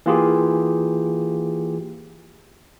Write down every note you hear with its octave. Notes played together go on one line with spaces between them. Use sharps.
E3 A#3 F4 G4 G#4